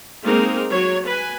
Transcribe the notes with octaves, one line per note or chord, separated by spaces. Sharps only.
G#3 A#3 C4 D#4 G#4 A#4
F#3 C#5
B4 G#5